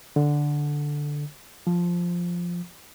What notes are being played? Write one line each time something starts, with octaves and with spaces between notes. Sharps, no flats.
D3
F3